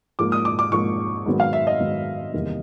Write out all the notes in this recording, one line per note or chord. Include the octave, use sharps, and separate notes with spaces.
G#2 F3 A#3 D6
D#6
D6
D6
G#2 F3 A#3 C#6
G#2 D#3 F#3 B3
F5
E5
D#5
G#2 D#3 F#3 B3
E2 C3 D#3 G3 A#3